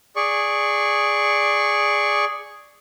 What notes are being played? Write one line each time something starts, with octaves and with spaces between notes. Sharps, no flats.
G#4 D5 C#6